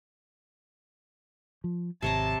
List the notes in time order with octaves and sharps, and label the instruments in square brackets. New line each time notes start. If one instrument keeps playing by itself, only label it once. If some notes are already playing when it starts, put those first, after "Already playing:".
[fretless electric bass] F3
[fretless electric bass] G#1 [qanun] C3 C#5 A#5 [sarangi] A5